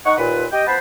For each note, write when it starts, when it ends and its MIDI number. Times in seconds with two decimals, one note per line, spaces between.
0.06 0.16 63
0.06 0.16 78
0.06 0.16 85
0.18 0.45 39
0.18 0.45 46
0.18 0.45 71
0.52 0.63 67
0.52 0.63 75
0.52 0.63 79
0.67 0.78 53
0.67 0.78 59
0.67 0.78 71
0.67 0.78 72
0.67 0.78 81
0.67 0.78 83